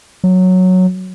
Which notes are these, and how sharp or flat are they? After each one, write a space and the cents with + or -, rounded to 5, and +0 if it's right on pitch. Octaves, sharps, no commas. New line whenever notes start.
F#3 -5